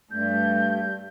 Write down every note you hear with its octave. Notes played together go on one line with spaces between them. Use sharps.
G2 A3 G6